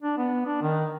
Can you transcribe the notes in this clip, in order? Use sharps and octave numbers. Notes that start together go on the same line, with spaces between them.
D4
B3
D4
D#3